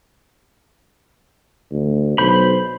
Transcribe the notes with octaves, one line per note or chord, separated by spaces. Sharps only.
D2
B1 C5 B5